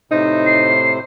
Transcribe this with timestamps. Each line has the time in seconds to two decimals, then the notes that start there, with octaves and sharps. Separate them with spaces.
0.12 A2 C3 D#4 C5
0.46 C7